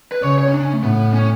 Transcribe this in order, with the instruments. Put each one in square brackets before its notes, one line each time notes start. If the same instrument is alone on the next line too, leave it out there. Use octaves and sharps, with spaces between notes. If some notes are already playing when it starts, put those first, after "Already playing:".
[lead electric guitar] B4
[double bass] C#3 [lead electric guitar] C#5
[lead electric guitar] C#5
C#4
D4
C#4
A3
[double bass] A2 [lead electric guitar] B3
[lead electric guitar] C#4